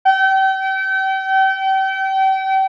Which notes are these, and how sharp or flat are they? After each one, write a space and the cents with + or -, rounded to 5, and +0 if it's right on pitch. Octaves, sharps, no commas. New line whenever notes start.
G5 -35